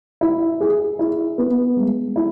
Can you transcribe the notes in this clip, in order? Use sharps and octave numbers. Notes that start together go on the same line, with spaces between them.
E4
G#4
E4
B3
G#3
E4